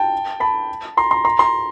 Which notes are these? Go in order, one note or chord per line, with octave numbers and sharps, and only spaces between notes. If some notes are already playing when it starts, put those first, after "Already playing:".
Already playing: G5 A5
A5 B5
A#5 C6
A#5 C6
A#5 C6
A#5 C6